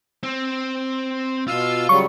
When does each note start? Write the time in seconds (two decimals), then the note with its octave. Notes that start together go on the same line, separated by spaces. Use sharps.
0.23 C4
1.48 B2 F4 F5 E6
1.89 C#3 F#3 G3 C#6